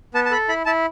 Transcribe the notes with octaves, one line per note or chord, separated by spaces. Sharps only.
B3 A5
A5
A4 B5
E4 B5
E4 A5